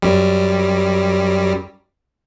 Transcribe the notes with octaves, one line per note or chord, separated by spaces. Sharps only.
F#2 G3